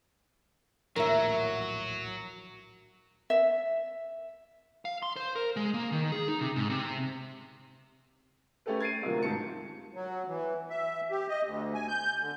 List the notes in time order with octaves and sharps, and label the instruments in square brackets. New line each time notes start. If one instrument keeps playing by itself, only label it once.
[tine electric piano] A#1 D#2 A2 [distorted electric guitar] F#3 [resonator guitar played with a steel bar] A#4 E5
[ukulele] E5
[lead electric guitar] F5
C6
C5
A#4
G#3
A#3
D#3
G#4
D#4
C3
G#2
C3
[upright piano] A3 C#4 G4 A4 B4
G#6 A6 C7 D7 D#7
D2 C3 F3 F#3 A#3
G#2 D#3 A5 C#7
[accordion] F#3
E3
E5
G4
D#5
D2
G#5
G6
D3